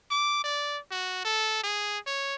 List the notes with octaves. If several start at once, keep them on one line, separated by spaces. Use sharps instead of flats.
D6
D5
F#4
A4
G#4
C#5